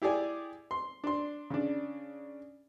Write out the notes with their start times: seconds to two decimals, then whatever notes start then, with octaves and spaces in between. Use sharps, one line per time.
0.02 E4 G4 G#4 D5 G#5
0.71 C6
1.04 D4 C6
1.50 C#3 D4